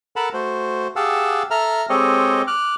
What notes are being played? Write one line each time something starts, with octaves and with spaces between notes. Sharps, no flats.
A4 A#4 F#5 A5 B5
A3 F#4 C5
G4 G#4 F5 F#5 A5 E6
A4 E5 A#5 F6
G#3 C4 G4 A4 C#5 D#5
D6 F6 F#6